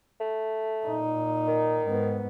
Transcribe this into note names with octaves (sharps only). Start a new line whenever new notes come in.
A3
A#2 D#4
D#3
G#2 B3